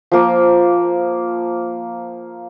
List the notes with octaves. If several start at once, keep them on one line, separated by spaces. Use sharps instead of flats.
F3 A#3